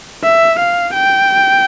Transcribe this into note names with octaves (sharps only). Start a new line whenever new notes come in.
E5
F5
G5